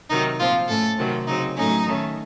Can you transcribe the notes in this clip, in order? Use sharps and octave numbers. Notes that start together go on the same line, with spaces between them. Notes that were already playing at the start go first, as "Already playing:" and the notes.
C3 D#3 F#3 D#4
A#2 F3 C4 F4
A2 A3 C#4 A4
C3 D#3 F#3 C4
C#3 F#3 C4 D#4
A2 F#3 A3 C#4 D#4
D#3 A3 C#4